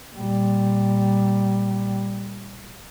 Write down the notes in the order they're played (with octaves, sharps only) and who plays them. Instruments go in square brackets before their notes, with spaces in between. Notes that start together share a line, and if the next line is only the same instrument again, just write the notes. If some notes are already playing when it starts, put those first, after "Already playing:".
[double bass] A#2 G3